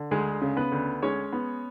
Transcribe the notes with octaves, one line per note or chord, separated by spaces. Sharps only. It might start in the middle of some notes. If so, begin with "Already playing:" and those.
Already playing: D3
D2 G#3 G#4
C#3
B3 B4
D2
G#3 C#4 C#5
B3